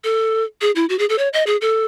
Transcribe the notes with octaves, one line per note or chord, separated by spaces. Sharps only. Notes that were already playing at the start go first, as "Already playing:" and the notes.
A4
G#4
E4
F#4
G#4
A4
C#5
D#5
G#4
A4